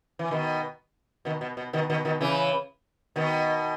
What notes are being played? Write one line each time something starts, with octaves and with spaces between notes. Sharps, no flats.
E3
B2 D#3
B2 D#3
B2
B2
B2 D#3
B2 D#3
B2 D#3
C#3 E3
B2 D#3